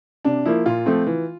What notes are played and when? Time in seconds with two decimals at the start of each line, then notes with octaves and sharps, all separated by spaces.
0.25 C3 D4
0.46 F3 A#3 E4
0.66 A#2 F4
0.86 F3 A3 C4
1.07 E3